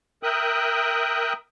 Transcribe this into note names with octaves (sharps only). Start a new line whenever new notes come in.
A#4 E5 G5 D#6 F#6